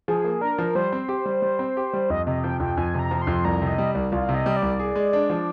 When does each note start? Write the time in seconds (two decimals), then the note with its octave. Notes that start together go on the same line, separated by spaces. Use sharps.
0.08 F3 G#4
0.24 A#3
0.41 D4 A#4
0.58 F3
0.75 G3 C5
0.92 C4
1.09 G4
1.26 G3
1.42 G3
1.59 C4
1.77 G4
1.93 G3
2.10 F2 D#5
2.26 C3 D#5
2.44 F3 G5
2.60 F2 G5
2.77 F2 G#5
2.94 C3 A#5
3.11 F3
3.22 C6
3.27 F2
3.45 C2 A#5
3.62 C3
3.67 D#5
3.78 G3
3.95 C2
4.12 C2 F4
4.29 C3
4.34 D#5
4.46 G3
4.56 D5
4.62 C2
4.80 G#4
4.95 G#3
5.13 D4
5.30 F3